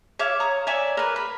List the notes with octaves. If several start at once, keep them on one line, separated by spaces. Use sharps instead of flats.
C#5 E5 F5 D6
C#5 A#5 D#6
C#5 D5 E5 G#5
A#4 B4
B5